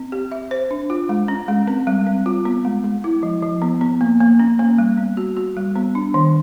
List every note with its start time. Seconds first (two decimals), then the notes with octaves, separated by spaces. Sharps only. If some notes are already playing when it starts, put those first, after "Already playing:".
Already playing: C4
0.12 G4
0.32 E5
0.51 C5
0.71 D4
0.90 F4
1.09 G#3
1.28 C#4
1.48 G#3
1.67 C4
1.87 G3
2.07 C4
2.26 F4
2.45 B3
2.65 G#3
2.84 G#3
3.04 E4
3.23 F3
3.42 F3
3.62 B3
3.81 B3
4.01 A#3
4.20 A#3
4.40 C#4
4.59 A#3
4.78 G3
4.97 B3
5.17 F#4
5.37 F#4
5.56 G3
5.76 B3
5.95 D4
6.14 D#3